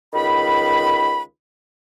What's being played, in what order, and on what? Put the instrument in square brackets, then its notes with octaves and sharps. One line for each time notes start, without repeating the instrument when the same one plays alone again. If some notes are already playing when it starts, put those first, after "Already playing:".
[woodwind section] C#2 D#3 B5